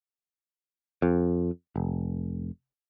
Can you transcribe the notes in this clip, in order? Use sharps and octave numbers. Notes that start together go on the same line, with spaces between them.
F2
F1